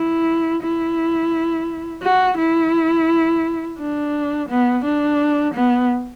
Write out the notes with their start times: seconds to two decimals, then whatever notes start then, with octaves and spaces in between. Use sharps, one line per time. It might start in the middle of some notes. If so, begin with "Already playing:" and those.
Already playing: E4
0.63 E4
2.03 F#4
2.38 E4
3.79 D4
4.49 B3
4.84 D4
5.54 B3